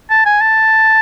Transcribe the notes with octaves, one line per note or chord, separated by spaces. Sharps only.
A5
G#5
A5